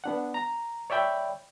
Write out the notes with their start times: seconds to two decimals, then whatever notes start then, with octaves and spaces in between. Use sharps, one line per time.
0.04 B3 D4 F#5
0.34 A#5
0.90 C#5 D5 E5 G5 B5